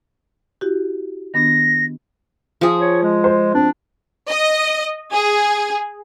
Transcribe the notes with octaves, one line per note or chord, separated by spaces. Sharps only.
E4 F#4 G4
D#3 B3 D4 A#6
F3 G#4
C#5
G#3
C5
C4 D4
D#5
G#4